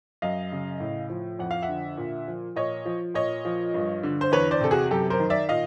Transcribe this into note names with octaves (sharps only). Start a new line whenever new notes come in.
F#2 D#5 F5
C#3
A2
F3
F2 F#5
F5
E5 F#5
D3
A#2
F3
A#2 C#5 D#5
F3
A#2 C#5 D#5
F3
G2
D3
C5
E2 B4 C#5
C5 D5
C3 A4
F#4 G#4
F#2 G4 A4
A#4 C5
D#3
D5 E5
A#2 D#5 F5